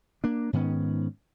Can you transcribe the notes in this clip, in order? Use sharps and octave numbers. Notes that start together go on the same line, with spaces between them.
A#3 D4
G#2 D#3 B3 C#4